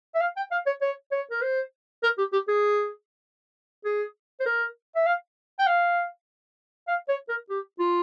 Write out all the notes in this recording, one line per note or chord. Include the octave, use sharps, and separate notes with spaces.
E5
F5
G5
F5
C#5
C#5
C#5
A#4
C5
A#4
G4
G4
G#4
G#4
C5
A#4
E5
F5
G5
F5
F5
C#5
A#4
G4
F4